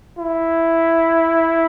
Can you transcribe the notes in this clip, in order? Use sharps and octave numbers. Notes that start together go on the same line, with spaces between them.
E4